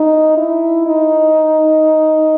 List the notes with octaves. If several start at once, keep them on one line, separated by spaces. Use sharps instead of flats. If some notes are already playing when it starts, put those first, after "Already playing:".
Already playing: D#4
E4
D#4